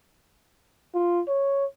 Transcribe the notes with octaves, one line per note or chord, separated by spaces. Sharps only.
F4
C#5